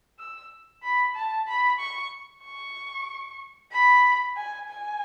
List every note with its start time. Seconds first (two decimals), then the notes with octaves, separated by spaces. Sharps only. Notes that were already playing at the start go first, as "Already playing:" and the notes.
0.19 E6
0.83 B5
1.15 A5
1.48 B5
1.79 C#6
2.44 C#6
3.72 B5
4.36 G#5
4.69 G#5